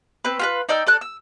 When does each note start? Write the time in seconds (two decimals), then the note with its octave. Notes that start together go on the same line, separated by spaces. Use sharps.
0.25 C4 B4
0.39 F4 G4 B4
0.69 D#4 D5 G5 E6
0.87 A4 D5 F#6
1.01 E6